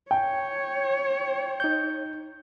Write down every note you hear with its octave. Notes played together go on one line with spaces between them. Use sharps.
C#5 G5
D#4 G6